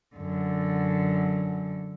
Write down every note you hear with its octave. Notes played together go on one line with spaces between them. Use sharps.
F#2 D3